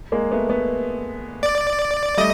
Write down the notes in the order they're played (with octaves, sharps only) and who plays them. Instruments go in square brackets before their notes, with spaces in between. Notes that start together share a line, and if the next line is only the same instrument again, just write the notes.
[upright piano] G#3 A#3
A3 B3
A3 B3
[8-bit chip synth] D5
[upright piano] G3 A3 [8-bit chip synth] D#5